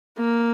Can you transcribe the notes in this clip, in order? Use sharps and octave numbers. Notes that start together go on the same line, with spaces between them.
A#3